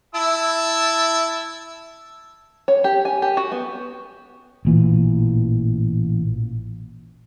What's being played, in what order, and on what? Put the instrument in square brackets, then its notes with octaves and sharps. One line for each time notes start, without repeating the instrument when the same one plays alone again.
[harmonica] E4 A5 E6
[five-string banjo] C#5
G4
G#5
G4
F#4
B3
[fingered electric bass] A1 A#2 E3